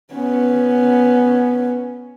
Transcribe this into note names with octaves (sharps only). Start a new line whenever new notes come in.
B3 C#4